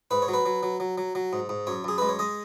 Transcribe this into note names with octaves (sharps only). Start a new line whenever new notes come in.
G#2 B4
C#5
F#3
B4
F#3
F#3
F#3
F#3
F#3
G#2
G#2
F#2 C#5
F#2 G#4
G#3 B4
C#5
G#3 D#5